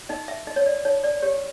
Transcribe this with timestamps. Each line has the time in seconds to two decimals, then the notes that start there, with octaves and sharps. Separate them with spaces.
0.09 D#4 D#5
0.28 E5
0.47 D#4 D#5
0.56 C#5
0.66 D5
0.85 D#4 C#5
1.04 D5
1.22 G4 C#5